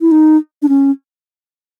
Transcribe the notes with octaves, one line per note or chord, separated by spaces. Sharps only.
E4
D#4
D4
C#4